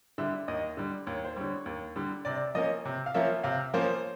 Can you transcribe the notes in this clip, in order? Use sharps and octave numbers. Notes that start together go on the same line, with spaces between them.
D3 G3 E5
D#2 D#5
D3 G3
D#2 C#5
C5
D3 G3 C#5
D#2
D3 G3
C3 D5
F3 A#3 C#4 D#5
C3
F5
F3 A#3 C#4 E5
C3 F5
F3 A#3 C#4 C5